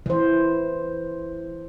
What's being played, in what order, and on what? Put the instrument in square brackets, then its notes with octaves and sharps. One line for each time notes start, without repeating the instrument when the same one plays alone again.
[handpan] E3 C5